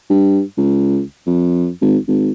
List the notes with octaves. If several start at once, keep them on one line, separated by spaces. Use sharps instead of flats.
G2
C#2
F2
G#1
G#1